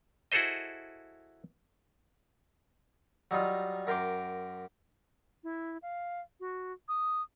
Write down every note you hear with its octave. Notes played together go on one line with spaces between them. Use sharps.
E4 F#4 G#4 A4 C5 D#5
F#3 G3 D#4 F4
F#2 A#4 G5 C6 D6
E4
F5
F#4
D#6